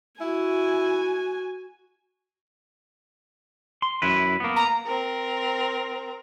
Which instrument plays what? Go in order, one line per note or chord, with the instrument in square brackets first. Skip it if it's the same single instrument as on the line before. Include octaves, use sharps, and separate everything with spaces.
[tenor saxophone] E4 [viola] F#4 G#5
[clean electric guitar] C6
F#2 E4 B4
A#3 B3
[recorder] A#5
[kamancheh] C4 A#4